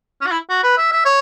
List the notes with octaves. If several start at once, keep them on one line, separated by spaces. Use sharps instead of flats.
C#4
F#4
E4
F#4
B4
E5
E5
C#5